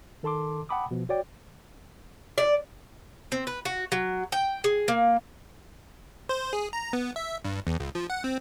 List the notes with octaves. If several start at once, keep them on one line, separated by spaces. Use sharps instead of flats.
D#3 A4 A5 C6 D6
F#5 G5 A5 B5 D6 D#6
B2 F3
F#4 C#5 D5 G5
D5
C4
B4
F#4
F#3
G5
G#4
A#3
C5
G#4
A#5
B3
E5
G2
E2
C#2
F3
F#5
C4